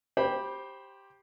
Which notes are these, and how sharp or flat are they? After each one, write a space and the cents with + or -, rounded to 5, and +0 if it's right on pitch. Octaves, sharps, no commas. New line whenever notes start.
G4 +0 C5 +15 B5 -15